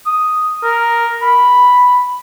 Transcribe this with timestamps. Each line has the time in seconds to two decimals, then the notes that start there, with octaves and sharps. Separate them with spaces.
0.06 D#6
0.63 A#4
1.22 B5